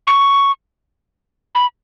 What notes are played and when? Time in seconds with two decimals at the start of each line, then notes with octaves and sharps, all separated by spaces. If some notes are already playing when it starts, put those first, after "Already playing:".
0.07 C#6
1.55 B5